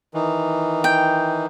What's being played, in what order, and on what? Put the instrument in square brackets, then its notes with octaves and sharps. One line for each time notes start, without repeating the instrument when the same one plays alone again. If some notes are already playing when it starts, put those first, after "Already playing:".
[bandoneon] D#3 E3
[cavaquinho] G5